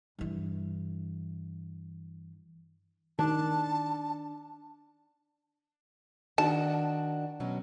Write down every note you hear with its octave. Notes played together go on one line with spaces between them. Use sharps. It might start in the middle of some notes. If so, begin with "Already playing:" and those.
G2 E3
D#3 D4 A5
D#3 D4 F#4 A5
B2 F#3 C#4